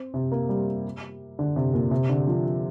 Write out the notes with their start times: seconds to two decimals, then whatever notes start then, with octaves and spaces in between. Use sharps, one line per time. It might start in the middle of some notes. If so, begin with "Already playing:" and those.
Already playing: C4
0.14 C3
0.32 A#3
0.49 G3
1.39 D3
1.56 C3
1.73 A#2
1.91 C3
2.09 D3
2.27 F3